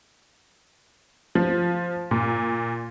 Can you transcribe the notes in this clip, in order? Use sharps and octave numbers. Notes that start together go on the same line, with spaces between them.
F3
A#2